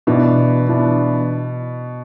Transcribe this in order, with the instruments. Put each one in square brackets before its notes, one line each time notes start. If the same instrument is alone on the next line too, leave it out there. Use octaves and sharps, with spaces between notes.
[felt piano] B2 [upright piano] E3 B3 D4
[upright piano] E3 B3 D4